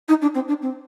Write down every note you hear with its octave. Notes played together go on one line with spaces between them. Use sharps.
D#4
D4
C4
D4
C4